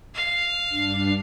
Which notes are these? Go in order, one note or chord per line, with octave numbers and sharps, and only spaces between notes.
F5
G2 D4